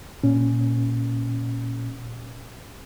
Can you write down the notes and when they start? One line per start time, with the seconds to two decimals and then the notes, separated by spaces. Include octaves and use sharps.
0.24 A#2 C#4